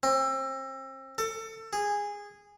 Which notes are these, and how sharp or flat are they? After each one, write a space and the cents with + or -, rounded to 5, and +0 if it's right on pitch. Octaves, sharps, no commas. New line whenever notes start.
C4 +35
A4 +25
G#4 -15